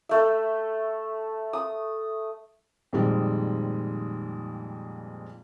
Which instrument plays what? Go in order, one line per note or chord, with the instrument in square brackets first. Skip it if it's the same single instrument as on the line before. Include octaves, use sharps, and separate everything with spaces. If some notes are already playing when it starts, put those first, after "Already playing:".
[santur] A3 E5
D#6
[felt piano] F2 A#2 D#3 G3 G#3 C4